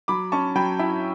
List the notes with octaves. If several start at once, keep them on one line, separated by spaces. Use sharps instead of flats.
F#3 B5 D6
C#4 A5 C#6
F#3 G5 B5
E4 E5 G5